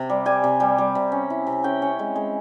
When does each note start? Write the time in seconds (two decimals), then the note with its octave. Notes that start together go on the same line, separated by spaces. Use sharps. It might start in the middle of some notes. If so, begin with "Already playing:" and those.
Already playing: C3
0.10 G3
0.26 G3 G#5
0.44 C3
0.60 G3
0.78 G3
0.95 C3
1.12 C#4
1.30 E4
1.47 C3
1.64 C#4 G5
1.82 C#4
1.99 G#3
2.15 G#3